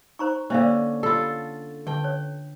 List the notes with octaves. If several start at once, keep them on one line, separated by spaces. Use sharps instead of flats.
D#4 C5 A#5 C#6
D3 A#3 C#4 C5 E5 F5
F4 A4 D5 B5
D3 G5 A5
C#5